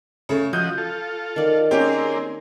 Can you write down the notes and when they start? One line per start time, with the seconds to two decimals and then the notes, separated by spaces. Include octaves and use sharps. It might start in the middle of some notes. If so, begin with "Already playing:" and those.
0.29 C#3 A3
0.53 F3 F#4 D#5 G6
0.78 F4 A4
1.36 D#3 D5
1.71 A#3 C4 C#4 G4 G#4